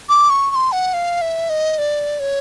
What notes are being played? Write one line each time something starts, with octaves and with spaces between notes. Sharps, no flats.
D6
C#6
C#6
C6
F#5
F5
E5
D#5
D5
C#5